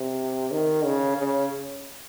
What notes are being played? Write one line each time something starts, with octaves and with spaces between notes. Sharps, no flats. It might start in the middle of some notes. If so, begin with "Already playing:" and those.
Already playing: C3
D#3
C#3
C#3